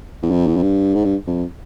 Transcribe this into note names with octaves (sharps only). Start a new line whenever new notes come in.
E2
F2
E2
F2
G2
G#2
G2
F2